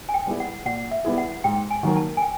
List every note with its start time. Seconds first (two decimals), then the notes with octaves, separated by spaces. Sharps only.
0.09 G#5
0.14 G5
0.27 G3 B3 E4 G#4
0.40 F#5
0.65 A#2 F#5
0.91 E5
1.05 G3 B3 E4 G#4
1.18 F#5
1.44 G#2 G5
1.71 G#5
1.83 D#3 F#3 A#3
1.97 A5
2.17 G#5
2.22 G5